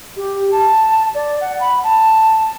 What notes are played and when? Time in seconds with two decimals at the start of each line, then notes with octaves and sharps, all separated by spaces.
0.17 G4
0.52 A5
1.15 D5
1.41 F#5
1.61 B5
1.84 A5